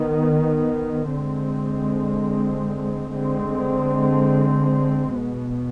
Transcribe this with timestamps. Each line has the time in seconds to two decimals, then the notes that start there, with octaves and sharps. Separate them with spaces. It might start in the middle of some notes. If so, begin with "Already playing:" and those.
Already playing: D#3 B3
1.11 D3 G#3 C4
3.12 D3 G#3 C4
5.14 B2 B3